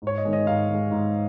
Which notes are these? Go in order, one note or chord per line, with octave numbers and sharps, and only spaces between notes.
G#2
C#5
D#5
D#3 G#3
D#5
G#2 F5
D#3 G#3
G#2